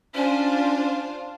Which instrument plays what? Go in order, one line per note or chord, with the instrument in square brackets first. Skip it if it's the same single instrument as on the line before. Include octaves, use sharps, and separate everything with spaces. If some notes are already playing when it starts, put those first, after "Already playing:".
[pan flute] C#4 [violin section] D4 F4 C5